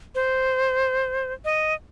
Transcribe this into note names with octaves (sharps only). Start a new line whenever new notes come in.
C5
D#5